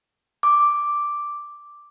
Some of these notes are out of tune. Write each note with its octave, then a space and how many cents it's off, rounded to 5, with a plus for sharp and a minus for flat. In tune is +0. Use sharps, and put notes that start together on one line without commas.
D6 +0